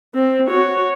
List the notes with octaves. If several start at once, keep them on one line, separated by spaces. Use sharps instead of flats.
C4
F#4 C#5